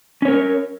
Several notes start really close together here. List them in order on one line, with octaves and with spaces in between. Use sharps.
C#4 C#5 A#4